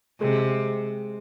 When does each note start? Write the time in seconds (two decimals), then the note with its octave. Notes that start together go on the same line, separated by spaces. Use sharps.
0.20 C3 G#3